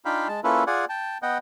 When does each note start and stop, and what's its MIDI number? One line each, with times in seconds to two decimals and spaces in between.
0.05 0.28 62
0.05 0.28 63
0.05 0.28 65
0.05 0.28 77
0.05 0.28 79
0.05 0.28 83
0.28 0.40 56
0.28 0.40 81
0.44 0.64 58
0.44 0.64 61
0.44 0.64 64
0.44 0.64 65
0.44 0.64 69
0.44 0.64 71
0.67 0.85 65
0.67 0.85 68
0.67 0.85 74
0.67 0.85 78
0.67 0.85 80
0.89 1.18 79
0.89 1.18 81
1.22 1.38 59
1.22 1.38 75
1.22 1.38 78
1.22 1.38 79